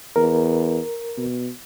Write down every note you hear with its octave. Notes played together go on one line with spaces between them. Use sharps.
E2 A#4
B2